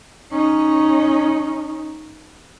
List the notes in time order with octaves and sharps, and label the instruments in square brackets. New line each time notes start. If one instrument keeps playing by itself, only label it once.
[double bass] C#4 D#4